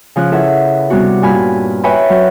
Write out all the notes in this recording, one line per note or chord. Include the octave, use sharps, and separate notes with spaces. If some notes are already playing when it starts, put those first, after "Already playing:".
C#3 F3 C#4 F#6
E4 G#4 A4 B4 E5 F#5
C3 G3 B3 C#4 F#4
G2 A#2 G#5 B5 F6
B4 C#5 E5 G5 G#5 B5
F#3